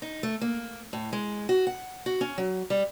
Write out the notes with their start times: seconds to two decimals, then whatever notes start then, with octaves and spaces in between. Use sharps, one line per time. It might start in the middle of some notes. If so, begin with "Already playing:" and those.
0.02 D#4
0.23 A3
0.41 A#3
0.93 A2
1.13 G#3
1.49 F#4
1.67 F#5
2.06 F#4
2.21 C#4
2.38 F#3
2.70 G3